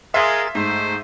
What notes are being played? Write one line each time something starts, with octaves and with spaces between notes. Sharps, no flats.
G#3 G#4 A#4 E5 F5 C6 A6
G#2 A3 C5